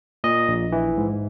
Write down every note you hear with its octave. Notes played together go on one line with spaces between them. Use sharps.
A#2 D#5
A#1
E3
G#2